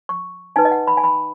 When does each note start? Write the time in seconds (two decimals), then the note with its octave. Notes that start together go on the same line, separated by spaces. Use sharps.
0.09 C#6
0.56 D#4 B4 G#5
0.65 D#5
0.71 F#5
0.87 B5
0.97 G#5
1.04 B5